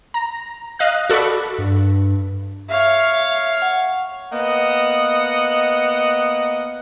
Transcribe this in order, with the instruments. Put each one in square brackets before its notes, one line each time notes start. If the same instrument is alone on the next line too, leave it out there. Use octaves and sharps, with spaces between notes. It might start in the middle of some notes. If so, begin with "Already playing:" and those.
[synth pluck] A#5
D#5 F5 F#6
F#4 A4 D5 B5 C#6
[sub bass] G2
[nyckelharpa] C#5 F5 [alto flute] E5
[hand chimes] F#5
[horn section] A#3 B3 D#5 F#5